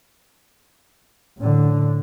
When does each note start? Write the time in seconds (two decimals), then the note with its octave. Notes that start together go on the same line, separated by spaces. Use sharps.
1.38 A2 D3